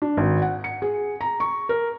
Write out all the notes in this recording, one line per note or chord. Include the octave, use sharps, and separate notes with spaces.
D4
G#1
F#5
C#7
G#4
A#5
C#6
A#4